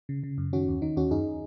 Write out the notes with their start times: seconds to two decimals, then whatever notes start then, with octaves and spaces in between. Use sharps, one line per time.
0.09 C#3
0.23 C#3
0.38 F#2
0.53 D#3 C#4 F#4
0.68 D#2
0.82 D#3 D#4
0.96 D#2 C#4 F#4
1.11 F#2 D#4 G#4